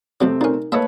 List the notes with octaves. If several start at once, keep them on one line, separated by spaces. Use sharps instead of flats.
F2 A2 C3 F#3 A3 C4
A#2 C#4 D#4 A#4
A3 A#3 B4 C#5 D#5 E5 A5